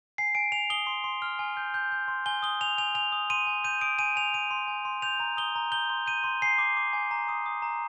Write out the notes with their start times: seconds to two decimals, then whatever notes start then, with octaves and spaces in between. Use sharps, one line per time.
0.18 G#5 C7
0.35 G#5 D7
0.52 G#5 F7
0.70 D#6 G7
0.87 C6
1.04 C6
1.22 F6
1.39 G#5
1.57 G6
1.74 G6
1.92 G6
2.08 C6
2.26 G#5 G7
2.43 D#6 G7
2.61 G#5 F7
2.78 G#5 F7
2.95 G#5 F7
3.12 D#6
3.30 C6 D#7
3.47 G#5
3.64 G6 D#7
3.81 D#6 D7
3.99 G#5 D#7
4.16 G#5 F7
4.33 G#5 D#7
4.51 C6
4.68 G#5
4.85 C6
5.02 G6 F7
5.20 A#5
5.37 D#6 G7
5.56 A#5
5.72 G6 G7
5.90 C6
6.06 G6 D#7
6.24 C6
6.42 G#5 C7
6.58 D6
6.77 D6
6.93 G#5
7.11 A#5
7.28 D#6
7.46 D#6
7.62 A#5